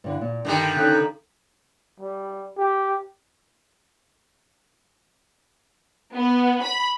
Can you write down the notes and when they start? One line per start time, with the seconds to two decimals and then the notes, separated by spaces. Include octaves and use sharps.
0.04 G2 D3 E3
0.21 A#2
0.45 G2 D3 D#3 G3
0.76 C#3 D#4 A4 F#6
0.91 A4 A#5
2.00 G3
2.58 G4
6.13 B3
6.62 B5